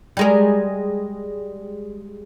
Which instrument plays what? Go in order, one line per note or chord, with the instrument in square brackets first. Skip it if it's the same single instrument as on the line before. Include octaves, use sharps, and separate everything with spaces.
[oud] G3 G#3 A#4